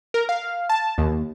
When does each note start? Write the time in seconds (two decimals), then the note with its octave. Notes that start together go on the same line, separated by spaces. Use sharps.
0.14 A#4
0.29 F5
0.69 A5
0.98 D#2